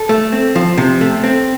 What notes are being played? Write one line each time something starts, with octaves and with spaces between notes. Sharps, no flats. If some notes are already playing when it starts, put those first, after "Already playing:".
Already playing: A4
A3
C4
F3
C3
A3
C4